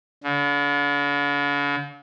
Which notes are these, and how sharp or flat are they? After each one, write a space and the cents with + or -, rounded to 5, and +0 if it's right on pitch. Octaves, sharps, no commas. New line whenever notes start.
D3 -45